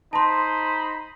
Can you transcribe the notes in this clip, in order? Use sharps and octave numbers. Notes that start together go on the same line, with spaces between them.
D#4 C5 A5 B5 C6